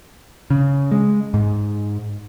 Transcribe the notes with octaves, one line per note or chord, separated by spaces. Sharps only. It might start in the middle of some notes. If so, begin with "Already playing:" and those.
C#3
G#3
G#2